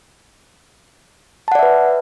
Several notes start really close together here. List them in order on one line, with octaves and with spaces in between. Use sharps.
A5 F#5 D5 E5 B4